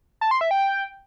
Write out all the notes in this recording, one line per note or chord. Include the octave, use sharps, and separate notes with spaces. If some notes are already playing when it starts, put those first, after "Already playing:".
A5
C6
E5
G5